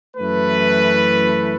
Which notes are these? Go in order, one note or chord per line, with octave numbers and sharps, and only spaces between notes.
F#2 E3 A3 B4